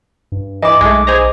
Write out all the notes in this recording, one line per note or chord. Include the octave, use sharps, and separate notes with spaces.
G2
E3 D#5 D6
B1 G#3 A3
G#4 C5 A#5